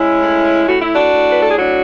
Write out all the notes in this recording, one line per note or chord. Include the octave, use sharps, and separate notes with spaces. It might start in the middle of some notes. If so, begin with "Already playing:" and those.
Already playing: G#3 C#4 E4
A2
A2 F#4
E4
D4 F#4
A2
B4
A4
G#4
F#3 D4 F#4